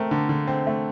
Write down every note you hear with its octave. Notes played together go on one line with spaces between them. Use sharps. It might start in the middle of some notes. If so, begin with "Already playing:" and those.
Already playing: A3 C4 A#4
D3
D3
C4
A3